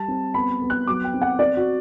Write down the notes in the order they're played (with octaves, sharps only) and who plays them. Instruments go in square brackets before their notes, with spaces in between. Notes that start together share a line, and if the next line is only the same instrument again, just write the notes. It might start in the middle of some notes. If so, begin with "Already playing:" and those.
Already playing: [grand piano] G3 A5
C4
B3 B5
B3
F#6
F#3 D6
G5
C4
F#5
C4 D5
F#4